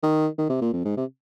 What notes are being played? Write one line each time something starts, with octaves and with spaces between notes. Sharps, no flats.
D#3
D#3
C3
A#2
F2
G#2
C3